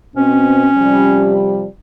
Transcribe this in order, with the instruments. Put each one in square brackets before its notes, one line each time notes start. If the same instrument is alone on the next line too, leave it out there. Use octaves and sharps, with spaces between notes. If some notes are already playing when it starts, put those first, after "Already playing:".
[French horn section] B2 C4 [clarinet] C#4
[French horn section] C3 F3 G3